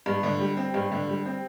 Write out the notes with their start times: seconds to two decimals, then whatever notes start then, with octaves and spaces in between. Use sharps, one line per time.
0.06 G2
0.23 D3
0.40 G3
0.57 C4
0.74 G2
0.92 D3
1.09 G3
1.25 C4